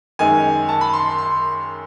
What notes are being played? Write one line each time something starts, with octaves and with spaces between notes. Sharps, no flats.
F#2 D#3 G#3 G#5
A5
B5
C6
C6
C6